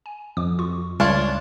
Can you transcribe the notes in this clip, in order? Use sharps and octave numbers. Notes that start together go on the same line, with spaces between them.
G#5
F2 D6
F4 C#6
C#2 G3 D4 F4 C#5